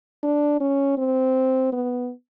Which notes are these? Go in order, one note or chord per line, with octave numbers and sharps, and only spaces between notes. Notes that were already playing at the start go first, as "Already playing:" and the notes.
D4
C#4
C4
B3